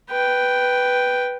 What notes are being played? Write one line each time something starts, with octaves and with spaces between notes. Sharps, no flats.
B4 G5